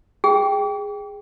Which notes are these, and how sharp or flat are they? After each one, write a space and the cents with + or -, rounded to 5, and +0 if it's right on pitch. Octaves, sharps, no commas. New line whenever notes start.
G#4 -10 G5 +0